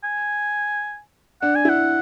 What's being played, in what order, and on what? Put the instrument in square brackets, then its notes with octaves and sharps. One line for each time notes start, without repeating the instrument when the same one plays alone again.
[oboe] G#5
[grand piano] D4 [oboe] F#5
[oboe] G#5
[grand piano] E4 [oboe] F#5